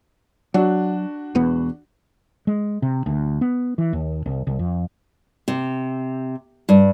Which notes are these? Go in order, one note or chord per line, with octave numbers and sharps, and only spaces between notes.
F#3 D4 F#4
E1 E2 B3
G#3
C3
D2
B3
E3
D#2
C2
C2
F2
C3
G2